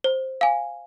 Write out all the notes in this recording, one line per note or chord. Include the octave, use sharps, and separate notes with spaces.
C5
F5 G#5